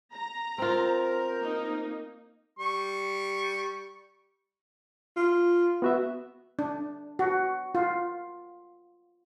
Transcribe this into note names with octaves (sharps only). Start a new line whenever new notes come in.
A#5
C4 F4 A#4 C5
A#3 D#4
G3 C#6
F4
B3 F#4 E5
D4
F#4
F4